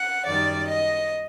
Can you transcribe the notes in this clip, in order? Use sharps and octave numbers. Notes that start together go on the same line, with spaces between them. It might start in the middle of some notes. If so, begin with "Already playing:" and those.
Already playing: F#5
F#2 D#3 G3 D5
D#5